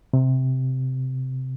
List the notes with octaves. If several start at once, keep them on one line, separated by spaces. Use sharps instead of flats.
C3